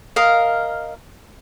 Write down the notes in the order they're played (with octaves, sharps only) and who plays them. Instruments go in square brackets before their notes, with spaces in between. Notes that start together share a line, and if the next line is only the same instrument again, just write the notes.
[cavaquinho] A#4 D#5 F5